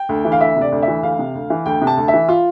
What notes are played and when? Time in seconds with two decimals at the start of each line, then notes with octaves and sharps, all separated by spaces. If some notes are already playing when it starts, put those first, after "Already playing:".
Already playing: G5
0.09 D2
0.25 E3
0.32 F5
0.40 D2 E5
0.56 C3 D5
0.72 D2
0.82 E5
0.88 E3
1.03 D2 F5
1.19 C3
1.35 D2
1.50 E3
1.66 D2 G5
1.82 C3
1.87 A5
1.97 D2
2.08 E5
2.14 E3
2.29 F4